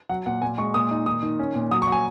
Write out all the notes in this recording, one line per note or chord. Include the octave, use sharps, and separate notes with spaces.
F#3 F#5
A#2 F#5
A#2 G#5
G#3 C#6
A#2 D#6
D#4
D#3 D#6
D#3
C#4
A#2
F#3 D#6
C#6
F#3
G#5